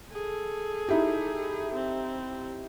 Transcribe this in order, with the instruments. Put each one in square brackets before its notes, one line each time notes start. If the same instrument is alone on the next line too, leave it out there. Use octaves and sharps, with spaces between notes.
[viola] G#4 A4
[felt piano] D#4 E4 G4
[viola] C4